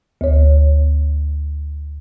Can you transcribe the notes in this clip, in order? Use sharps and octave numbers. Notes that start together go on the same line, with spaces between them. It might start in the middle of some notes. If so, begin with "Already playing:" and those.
D2 C#5